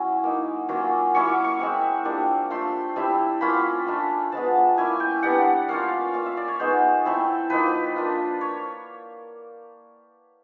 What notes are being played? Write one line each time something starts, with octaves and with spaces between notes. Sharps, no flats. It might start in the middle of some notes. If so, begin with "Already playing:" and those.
Already playing: F#3 C#4 E4
A#3 D#4
F#3 A#3 C#4 F4
F#3 A#3 C#4 E4 C#6
D6
C#6
G#3 C4 E4
G3 A#3 D4 F4
A3 D4 F4 C6
G3 C4 E4
A#3 C#4 F4 B5
A3 D4 F4
F3 G#3 B3 A5
A#3 C#4 E4 G#5
G5
G3 B3 D4 F#5
A#3 C#4 F4 F5
A#3 C#4 F4 F5
E5
D5
C#5
G#3 B3 D#4 C5
A3 C4 E4
F3 A#3 D#4 B4
A#3 D4 F4
C#5